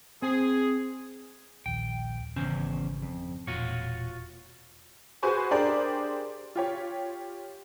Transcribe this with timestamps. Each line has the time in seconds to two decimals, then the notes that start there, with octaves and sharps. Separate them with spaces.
0.22 C4 G#4
1.66 A#1 D#2 G5
2.36 G#1 E2 C#3 C#4 C5
3.02 F2
3.47 E1 A#2 F4 F#4 C#5
5.23 F#4 G#4 B4 C5 G#5 C#6
5.51 D4 G4 G#4 A#4 C5 D5
6.55 F4 G4 C#5